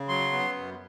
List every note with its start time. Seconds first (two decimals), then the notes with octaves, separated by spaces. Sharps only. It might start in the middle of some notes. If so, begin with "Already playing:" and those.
Already playing: C#3
0.08 F#3 C6
0.32 B3
0.56 F#2